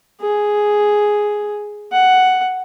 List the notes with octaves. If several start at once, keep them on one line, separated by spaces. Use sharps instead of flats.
G#4
F#5